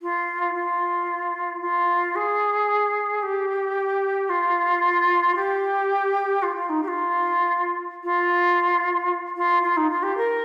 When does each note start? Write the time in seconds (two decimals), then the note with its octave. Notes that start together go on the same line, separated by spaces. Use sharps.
0.02 F4
0.54 F4
1.62 F4
2.16 G#4
3.23 G4
4.29 F4
5.35 G4
6.42 F4
6.56 F4
6.69 D#4
6.83 G4
6.88 F4
8.04 F4
9.36 F4
9.63 F4
9.77 D#4
9.90 F4
10.03 G4
10.17 A#4